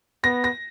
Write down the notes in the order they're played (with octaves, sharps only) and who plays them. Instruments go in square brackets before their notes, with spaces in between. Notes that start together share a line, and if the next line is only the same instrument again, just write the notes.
[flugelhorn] B3 [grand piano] A#6
[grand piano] A#6